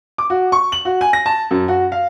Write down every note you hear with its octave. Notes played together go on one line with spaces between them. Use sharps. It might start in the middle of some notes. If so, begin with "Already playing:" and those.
D6
F#4
C#6
F#7
F#4
G#5
A#6
A5
F#2
F#4
F5